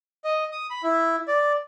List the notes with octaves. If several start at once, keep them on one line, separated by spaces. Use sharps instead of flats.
D#5
D#6
B5
E4
D5